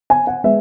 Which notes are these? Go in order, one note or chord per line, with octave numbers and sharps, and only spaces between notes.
G#5
F#5
G#3 B3 E5